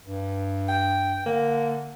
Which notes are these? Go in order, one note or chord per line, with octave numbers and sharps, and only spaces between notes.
G2
G5
D3 A#3